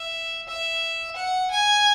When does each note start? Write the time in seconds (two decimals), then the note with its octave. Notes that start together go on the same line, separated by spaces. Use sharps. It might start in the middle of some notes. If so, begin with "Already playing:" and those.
Already playing: E5
0.48 E5
1.16 F#5
1.51 G#5